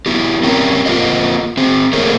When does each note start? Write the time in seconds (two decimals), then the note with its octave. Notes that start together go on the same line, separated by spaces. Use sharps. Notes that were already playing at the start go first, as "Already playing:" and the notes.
0.06 B3 E4 G4
0.43 C4 C#4 G4 A#4
0.86 A#3 C4 F4 A4 C5 D#5
1.57 C4 G#4 C5
1.93 A3 A#3 G#4 A#4 C5 C#5